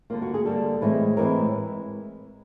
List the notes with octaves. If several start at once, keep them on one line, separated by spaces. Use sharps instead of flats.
D3 G3 A#3 F4
F#4
G#4
D3 G3 A#3 A4
A2 E3 G#3 C4 E4
A2 E3 G#3 C4 E4 A#4